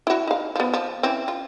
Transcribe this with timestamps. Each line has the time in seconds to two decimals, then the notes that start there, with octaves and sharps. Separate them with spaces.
0.07 E4 F#4
0.27 D#4 F5
0.55 F3 B3
0.73 F3
1.03 E3 C4 C#4
1.28 F4